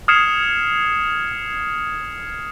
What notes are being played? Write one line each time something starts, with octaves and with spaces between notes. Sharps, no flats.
D#6 F6 G#6 C7 C#7 E7